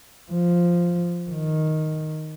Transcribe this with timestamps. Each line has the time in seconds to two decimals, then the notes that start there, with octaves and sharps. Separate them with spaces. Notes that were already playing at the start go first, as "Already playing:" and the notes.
0.32 F3
1.30 D#3